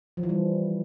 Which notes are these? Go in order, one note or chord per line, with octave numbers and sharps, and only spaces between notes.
F3
E3
G3